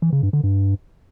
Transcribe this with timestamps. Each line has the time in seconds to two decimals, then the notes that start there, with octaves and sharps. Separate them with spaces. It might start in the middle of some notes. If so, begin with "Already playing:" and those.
0.02 E3
0.13 C#3
0.23 G2
0.33 D3
0.44 G2